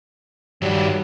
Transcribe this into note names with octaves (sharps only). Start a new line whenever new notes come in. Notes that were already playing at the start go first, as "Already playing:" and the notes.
G2 D#3 F#3 G3